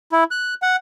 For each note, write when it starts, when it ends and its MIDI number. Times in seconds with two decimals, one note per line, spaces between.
0.12 0.24 64
0.31 0.54 90
0.62 0.76 78